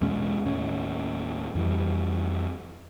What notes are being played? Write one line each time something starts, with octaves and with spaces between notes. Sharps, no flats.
E2 B2 G#3 C#4
D#2 A2 C#4
F2 E3 G3